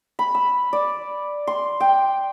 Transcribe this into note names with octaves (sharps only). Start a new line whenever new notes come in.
B5
E6
D5
C6
G5